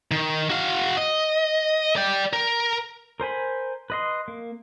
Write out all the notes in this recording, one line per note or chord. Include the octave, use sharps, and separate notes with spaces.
D#3
F#4 F5
D#5
D5 G5
A#4
A#4 C5 G#5 B5
B4 D#5 C6
A#3